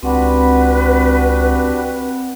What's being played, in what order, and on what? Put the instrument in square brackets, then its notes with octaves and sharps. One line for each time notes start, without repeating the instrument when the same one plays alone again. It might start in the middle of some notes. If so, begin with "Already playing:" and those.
[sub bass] C#2 [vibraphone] C4 F#5 B5 [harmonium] D4 F#4 G4 [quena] B4